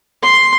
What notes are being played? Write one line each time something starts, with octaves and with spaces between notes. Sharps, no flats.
C6